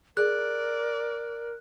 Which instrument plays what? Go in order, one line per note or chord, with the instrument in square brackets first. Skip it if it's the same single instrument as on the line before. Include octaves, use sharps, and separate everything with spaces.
[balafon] G#4 [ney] A#4 [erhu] D5 [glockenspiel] F#6